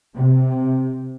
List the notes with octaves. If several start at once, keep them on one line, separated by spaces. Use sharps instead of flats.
C3